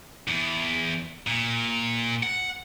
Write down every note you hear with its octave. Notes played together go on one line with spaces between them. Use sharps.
E2
A#2
F#5